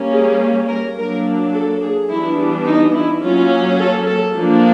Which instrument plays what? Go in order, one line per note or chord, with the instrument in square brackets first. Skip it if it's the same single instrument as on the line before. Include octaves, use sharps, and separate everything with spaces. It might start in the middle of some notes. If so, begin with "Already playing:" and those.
Already playing: [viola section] G3 A#3 C#4
G#4
A#4
F#3 A#3 D4 A#4
A4
G#4
E3 G3 B3 D4 E4
D#4
E4
F#3 A#3 C#4 F4
A4
A4
F3 A#3 D4